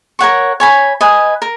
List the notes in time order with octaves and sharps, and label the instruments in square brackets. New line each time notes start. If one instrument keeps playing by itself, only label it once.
[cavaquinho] A#4 C#5 F#5 C#6
C#5 G#5 B5
B4 D#5 G#5
A#4